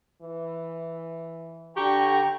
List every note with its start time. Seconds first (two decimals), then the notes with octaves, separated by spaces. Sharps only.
0.22 E3
1.77 D3 G4 G5 A#5 C#6